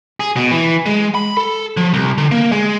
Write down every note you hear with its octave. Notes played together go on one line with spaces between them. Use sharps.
G#4
B2
E3
G#3
B5
A4
F3
C2
D3
A#3
G#3